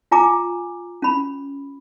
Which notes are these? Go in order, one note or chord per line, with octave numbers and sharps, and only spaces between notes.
F4 G#5 A#5 D6
C#4 B5